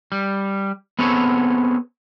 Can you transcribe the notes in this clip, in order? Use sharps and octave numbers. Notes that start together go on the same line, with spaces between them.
G3
B3 C4 G#4 A4 C#5